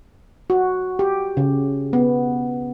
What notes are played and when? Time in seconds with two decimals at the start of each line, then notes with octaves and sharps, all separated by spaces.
0.50 F#4
0.99 G4
1.37 C#3
1.93 B3